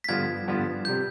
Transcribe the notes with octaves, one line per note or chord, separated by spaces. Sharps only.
B6
G2 D3 F3 B3 F4 G#6
G2 D3 F3 B3 F4
C3 G3 G6